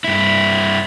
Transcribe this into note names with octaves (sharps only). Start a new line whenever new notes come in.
G2 E4